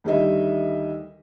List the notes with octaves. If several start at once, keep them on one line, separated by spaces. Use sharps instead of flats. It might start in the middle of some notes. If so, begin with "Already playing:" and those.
D2 D#3 G3 G4 D#5 E5